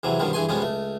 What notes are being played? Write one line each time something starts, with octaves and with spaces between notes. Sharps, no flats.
E2 C3 E3 F#3
G2 B2 D#3 F3 G3
G2 E3 G#4 G#5 C6
F2 B2 G3 G#3 B3 C#4
C#2 A3